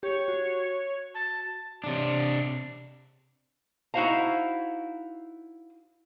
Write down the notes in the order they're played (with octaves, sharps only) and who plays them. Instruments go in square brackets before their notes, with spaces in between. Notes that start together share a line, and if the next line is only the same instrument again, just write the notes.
[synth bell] G4 [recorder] C#5
[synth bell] F#4
[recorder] A5
[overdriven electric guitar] C3 D4
[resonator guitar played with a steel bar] D#4 E4 F#4 C5 F5 A#5